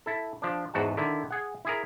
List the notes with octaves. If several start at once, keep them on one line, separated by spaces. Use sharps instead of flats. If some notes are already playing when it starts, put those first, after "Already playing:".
E4 A4
F3 D4
E2 G#2 F#4 F#5 A5
D3 D#3 E4
G#4 F#5
E4 G#4 A#4